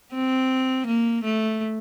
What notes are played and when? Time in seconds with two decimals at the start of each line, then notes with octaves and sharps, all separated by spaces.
0.14 C4
0.87 A#3
1.24 A3